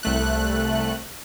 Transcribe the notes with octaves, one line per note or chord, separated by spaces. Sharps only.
C2 A3 F#6